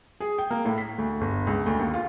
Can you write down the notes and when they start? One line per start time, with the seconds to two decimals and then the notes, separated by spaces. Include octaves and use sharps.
0.20 G#4
0.38 G5
0.51 A#3
0.65 A2
0.78 B6
0.98 D2
1.21 G1
1.47 C#2
1.66 D2
1.79 D#2
1.94 F4